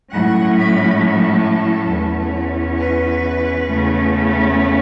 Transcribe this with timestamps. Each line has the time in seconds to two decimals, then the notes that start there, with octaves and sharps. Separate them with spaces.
0.11 A2 F#3 C#4 F#5
0.56 B5
1.00 A4
1.89 E2 E3 C#4
2.78 B4
3.67 E2 C#3 A3 C#4